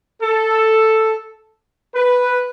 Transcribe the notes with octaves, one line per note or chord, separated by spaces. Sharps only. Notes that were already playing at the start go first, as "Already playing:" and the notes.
A4
B4